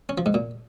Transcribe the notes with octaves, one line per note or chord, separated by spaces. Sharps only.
C#4
F3
G#2
A#2